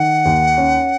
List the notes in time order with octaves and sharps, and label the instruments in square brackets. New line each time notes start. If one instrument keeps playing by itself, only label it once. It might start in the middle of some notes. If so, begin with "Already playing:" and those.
Already playing: [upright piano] D#3 [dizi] F#5
[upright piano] D#2
C#4